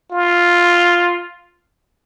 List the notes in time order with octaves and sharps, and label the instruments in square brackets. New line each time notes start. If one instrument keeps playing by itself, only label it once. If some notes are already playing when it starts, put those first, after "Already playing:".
[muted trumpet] F4